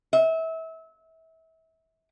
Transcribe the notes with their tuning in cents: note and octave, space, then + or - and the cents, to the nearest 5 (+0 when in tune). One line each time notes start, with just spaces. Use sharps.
E5 -30